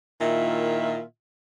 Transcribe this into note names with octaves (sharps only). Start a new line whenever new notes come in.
A#2 D#3 E4 F4 E5